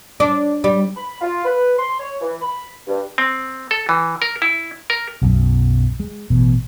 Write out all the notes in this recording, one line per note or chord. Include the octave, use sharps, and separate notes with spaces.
D4
G3
B5
F4
B4
C6
C#5
E3
B5
G2
C4
A4
E3
A#4
E4
A#4
B1 F#2
G#3
A1 B2